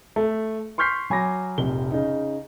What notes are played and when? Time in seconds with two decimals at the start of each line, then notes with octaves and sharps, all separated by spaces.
0.16 A3
0.78 C6 C#6 F6 G6 B6 C7
1.10 F#3 G#5 B5 D6 A#6
1.58 F1 A#1 C3 G7
1.92 C#3 D#4